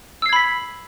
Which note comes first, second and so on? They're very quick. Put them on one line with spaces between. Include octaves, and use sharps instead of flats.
E6 C7 G#6 B5 B6